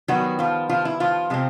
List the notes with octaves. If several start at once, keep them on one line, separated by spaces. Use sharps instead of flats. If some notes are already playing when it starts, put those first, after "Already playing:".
D#3 F#3 G3 B3 F#4
F3 F4
F3 F4
E4
F3 F4
C3 F3 G#3 C4